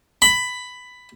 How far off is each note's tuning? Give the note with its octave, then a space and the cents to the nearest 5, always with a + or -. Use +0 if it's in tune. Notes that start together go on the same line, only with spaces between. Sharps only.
B5 +10